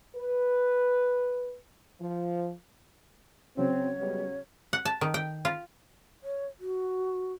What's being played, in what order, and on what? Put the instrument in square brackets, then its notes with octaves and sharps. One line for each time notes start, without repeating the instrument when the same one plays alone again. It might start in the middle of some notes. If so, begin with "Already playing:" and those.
[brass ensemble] B4
F3
[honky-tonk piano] C#3 F#3 [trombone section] C4 [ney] C#5
[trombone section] G3 G#3 B3
[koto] F#5
A5
D#3
G5
F4
[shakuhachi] C#5
F#4